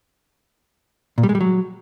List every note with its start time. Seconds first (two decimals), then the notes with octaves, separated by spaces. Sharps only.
1.18 A#2
1.23 G3
1.29 G#3
1.35 G3
1.41 F#3